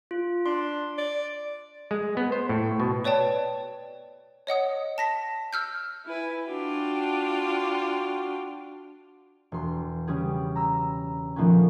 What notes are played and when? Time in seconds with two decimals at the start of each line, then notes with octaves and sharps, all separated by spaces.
0.11 F4
0.46 D4 C6
0.98 D5
1.91 G#3
2.17 B3
2.32 C5
2.49 A2
2.80 B2
3.04 B4 C#5 D5 G5 A5
4.47 C#5 D#5 F#5 D#6
4.98 A5 A#6 B6
5.53 E6 F6 G6
6.06 E4 B4 G#5
6.48 D4 F4 F#4 G5
9.52 E1 C6
10.07 C#3 G3 B3 C#4 G4 G#4
10.55 A#5 B5 E6
11.36 A#2 D#3 F3 A3 B3 C#4